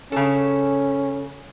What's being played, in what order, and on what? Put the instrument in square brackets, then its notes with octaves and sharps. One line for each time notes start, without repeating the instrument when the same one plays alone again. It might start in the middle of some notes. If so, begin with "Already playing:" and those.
[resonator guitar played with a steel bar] C#3 A4 [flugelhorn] C#4